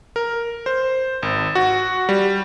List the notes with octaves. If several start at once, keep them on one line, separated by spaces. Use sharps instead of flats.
A#4
C5
G#1
F#4
G3